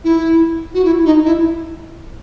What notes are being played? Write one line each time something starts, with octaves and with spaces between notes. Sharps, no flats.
E4
F#4
E4
D#4
E4